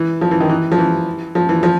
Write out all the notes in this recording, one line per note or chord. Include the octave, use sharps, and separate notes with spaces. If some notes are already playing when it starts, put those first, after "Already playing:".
Already playing: E3
F3
E3
D#3
E3
F3
E3
F3
E3
F3